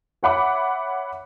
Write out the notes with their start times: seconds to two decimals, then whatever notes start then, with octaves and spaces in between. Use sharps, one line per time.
0.23 C#5 E5 F#5 B5 D6